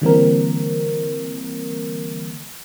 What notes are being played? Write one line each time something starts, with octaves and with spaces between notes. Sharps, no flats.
D3 E3 G3 A#3 C4 A#4